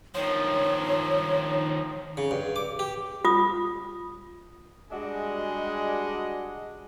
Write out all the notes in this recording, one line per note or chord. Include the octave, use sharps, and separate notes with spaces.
D#3 F3 C#5
C#3
G2
D6
G4
F4 D#6
G3 G#3 D4 F#4 G#4 D#5